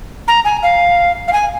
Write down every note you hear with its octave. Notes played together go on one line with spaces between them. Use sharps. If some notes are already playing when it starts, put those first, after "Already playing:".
A#5
G#5
F5
F5
G#5